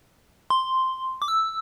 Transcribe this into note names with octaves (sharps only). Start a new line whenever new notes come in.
C6
D6
E6